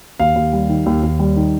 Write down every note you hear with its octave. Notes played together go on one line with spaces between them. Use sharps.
D#2 F5
D#2
G3
D#3
D#2
D#2
G3
D#3